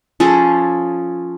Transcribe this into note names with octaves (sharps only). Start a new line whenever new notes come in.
F3 C#4 G#4 A4